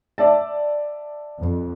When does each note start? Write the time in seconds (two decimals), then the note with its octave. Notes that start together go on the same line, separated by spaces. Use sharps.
0.18 D5 E5 A5
1.39 F2